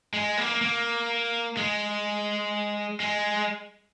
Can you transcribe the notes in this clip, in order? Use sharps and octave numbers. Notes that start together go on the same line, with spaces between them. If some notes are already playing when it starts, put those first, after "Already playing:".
G#3
A#3
A#3
G#3
G#3